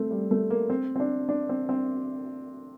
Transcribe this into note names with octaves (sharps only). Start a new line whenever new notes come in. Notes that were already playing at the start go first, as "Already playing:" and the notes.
Already playing: A3 C4
G3
A3
A#3
C4
C4
D4
D4
C4
C4